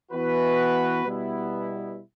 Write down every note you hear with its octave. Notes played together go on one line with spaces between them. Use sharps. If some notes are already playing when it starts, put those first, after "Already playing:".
E3 B3 F#4 B4
B2 G3 B3 E4